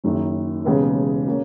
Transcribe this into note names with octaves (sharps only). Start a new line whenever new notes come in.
F#1 F#2 D#3
E1 D#2 C#3 G#3 B3
B2 A#3 C#4